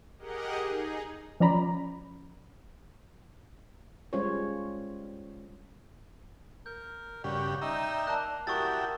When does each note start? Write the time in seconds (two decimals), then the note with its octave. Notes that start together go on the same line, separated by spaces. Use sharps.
0.19 G4 G#4 A#4 D#5 F#5
0.62 D#4 G#4
1.40 F3 C#4 D5 A#5 B5
4.13 G3 G#3 C#4 F4 C5 C#5
6.66 A#4 G6
7.24 G2 C#3 F#4 G4 D5
7.61 D#4 E5 G5 A#5
8.07 A#3 A5 F#6
8.47 G3 E4 F#4 G4 A#4 C#6 D#6 A6